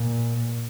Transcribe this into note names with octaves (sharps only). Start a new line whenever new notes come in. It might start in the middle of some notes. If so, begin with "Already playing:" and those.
Already playing: A#2